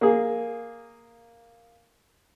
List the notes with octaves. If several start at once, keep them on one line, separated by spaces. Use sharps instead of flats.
A#3 G#4